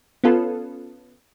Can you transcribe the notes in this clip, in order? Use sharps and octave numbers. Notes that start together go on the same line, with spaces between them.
B3 C#4 F4 A4 B4